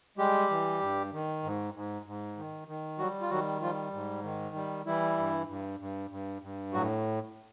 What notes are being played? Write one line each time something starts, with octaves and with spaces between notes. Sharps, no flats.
G3 G#3 G4
E3
G2
D#3
G#2
G#2
G#2
D#3
D#3
F#3 G3 F#4
F4
D#3 F#3 F#4
F3 G3 F4
G#2
D#3
G3
E3 G3 E4
G2
G2
G2
G2
G2
A2 F#3 F#4